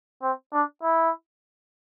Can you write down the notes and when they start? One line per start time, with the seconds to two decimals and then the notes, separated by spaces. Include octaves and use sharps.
0.22 C4
0.53 D4
0.83 E4